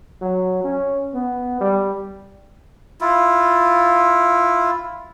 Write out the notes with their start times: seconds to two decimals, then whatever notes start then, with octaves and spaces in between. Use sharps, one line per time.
0.22 F#3
0.64 C#4
1.14 B3
1.61 G3
3.01 E4 F4